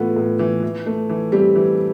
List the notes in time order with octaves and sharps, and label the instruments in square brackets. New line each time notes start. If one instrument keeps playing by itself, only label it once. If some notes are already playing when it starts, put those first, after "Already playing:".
Already playing: [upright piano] A2 E3 B3 F4 [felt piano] A3 A4 B4
[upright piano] A2
E3
E3
A3
E3
[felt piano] G3 G4 [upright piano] C4
[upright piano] E3